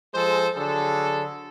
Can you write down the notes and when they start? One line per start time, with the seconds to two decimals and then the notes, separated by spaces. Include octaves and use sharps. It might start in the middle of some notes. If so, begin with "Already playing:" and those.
0.13 F3 G#3 G#4 A4 C5
0.54 D3 F#3 G#4 A4